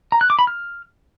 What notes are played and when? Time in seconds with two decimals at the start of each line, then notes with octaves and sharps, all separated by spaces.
0.12 A#5
0.21 F#6
0.30 D6
0.39 B5
0.47 F6